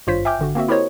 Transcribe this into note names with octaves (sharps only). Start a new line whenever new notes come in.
G#1 G2 F4 C5 C#5 B6
E5 G5 G#5 D6 F6 G6
G#1 D3 F#4
A#3 C4 F#4 E5
E4 G4 A#4 C5 C#5 D#5